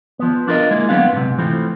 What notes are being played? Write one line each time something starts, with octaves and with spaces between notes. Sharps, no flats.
F3 B3
D4 F4 A#4 B4 D#5
G#3 A#3 E4
F#3 B3 C4 D4 F5
G#2 C3
E3 F3 A3 C4